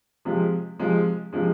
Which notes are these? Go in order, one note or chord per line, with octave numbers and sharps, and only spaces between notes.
C3 F3 G#3
C3 F3 G#3
C3 F3 G#3